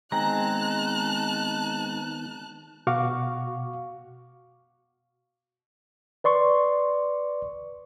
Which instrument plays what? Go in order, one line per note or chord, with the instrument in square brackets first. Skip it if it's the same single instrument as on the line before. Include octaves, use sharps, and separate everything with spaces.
[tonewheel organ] D#3 B3 D#4 [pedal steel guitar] G#3 C4 [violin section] A5 F#6 [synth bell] A#5
[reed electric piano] B2 F#4 F5 C#6 D6
[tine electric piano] B4 D5 C6 C#6